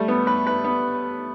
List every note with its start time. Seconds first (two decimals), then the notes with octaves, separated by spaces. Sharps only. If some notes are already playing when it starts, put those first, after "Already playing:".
Already playing: G3 A3
0.08 B3
0.27 B4
0.47 B4
0.64 B3